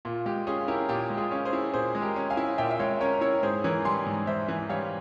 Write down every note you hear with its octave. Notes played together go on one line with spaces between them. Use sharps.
A#2 F4
G#3 G4
C#4 F4 G#4
E4 G4 A#4
A#2 G4
G#3
F4 G#4
C#4
G#4 C5
E4
A#2 G#4 C5
G#3
G4 A#4
C#4
F5 G#5
E4
A#2 E5 G5
E5
G#3 C#5 F5
C#4 A#4 C#5
E4 A#4 C#5
G#2 G#4 C5
E3 A#4 C#5
G3 G#5 C6
G#2
G#2 C5 E5
E3
G3 C#5 F5